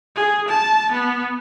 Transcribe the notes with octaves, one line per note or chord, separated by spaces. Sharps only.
G#4
A5
B3